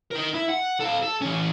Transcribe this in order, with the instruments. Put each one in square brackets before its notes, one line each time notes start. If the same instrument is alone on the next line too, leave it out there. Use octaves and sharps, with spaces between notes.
[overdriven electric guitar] D#4 A#4
E4
F#5
A4 F5
A4
E3 C#4